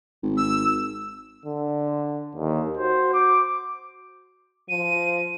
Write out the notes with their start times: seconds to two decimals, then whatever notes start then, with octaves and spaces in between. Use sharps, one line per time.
0.23 G#1
0.37 E6
1.45 D3
2.35 D#2
2.77 F#4 C5
3.13 D6
4.69 F3 D#7